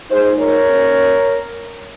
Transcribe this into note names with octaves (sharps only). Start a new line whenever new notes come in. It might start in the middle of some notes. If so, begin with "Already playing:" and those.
A#2 G#3 D#4 G#4 C5
A#4 C#5
D#3 A#3 C#4